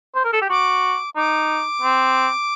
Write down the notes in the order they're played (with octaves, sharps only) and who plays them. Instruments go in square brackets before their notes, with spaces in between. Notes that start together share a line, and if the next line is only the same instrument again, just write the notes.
[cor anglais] C5
A#4
A4
G4
[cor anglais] F#4 [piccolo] D6
[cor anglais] D#4 [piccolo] D6
[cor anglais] C4